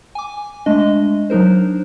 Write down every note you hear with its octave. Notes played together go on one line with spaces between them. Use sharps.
G#5 D6
G#3 A3 D4 D#5
F#3 D4 D#4 A#4 C5